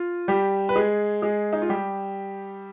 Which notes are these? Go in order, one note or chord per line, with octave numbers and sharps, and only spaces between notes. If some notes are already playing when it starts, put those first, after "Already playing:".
Already playing: F4
G3 G4
B4
G#3 G#4
G#3 G#4
D#4
F4
G3 G4